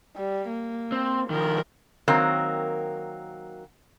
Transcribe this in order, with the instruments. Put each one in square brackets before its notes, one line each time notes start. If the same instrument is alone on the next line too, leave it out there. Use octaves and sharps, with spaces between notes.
[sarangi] G3
A#3
[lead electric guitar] C4
[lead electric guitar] D#3 F3 [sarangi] A#4
[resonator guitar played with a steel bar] D#3 F#3 A#3 C4